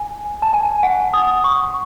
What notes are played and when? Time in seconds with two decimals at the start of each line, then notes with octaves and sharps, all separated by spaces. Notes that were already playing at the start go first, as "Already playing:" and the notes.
Already playing: G#5
0.42 A5
0.53 G#5
0.83 F#5
1.13 D#6
1.44 C#6